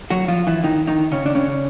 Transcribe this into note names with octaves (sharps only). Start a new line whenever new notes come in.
F#3 F#4
F3 F4
E3 E4
D#3 D#4
D#3 D#4
C#3 C#4
D4
C#3 C#4